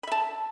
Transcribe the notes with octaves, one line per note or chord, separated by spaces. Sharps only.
E5 A5 B5